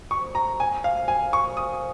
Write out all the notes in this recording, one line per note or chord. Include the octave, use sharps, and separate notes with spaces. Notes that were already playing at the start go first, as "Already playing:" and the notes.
C#6
A#5
G#5
F5
G#5
C#6
D#6